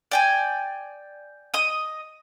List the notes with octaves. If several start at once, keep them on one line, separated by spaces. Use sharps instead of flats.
D5 G5 G#5
D#5 D#6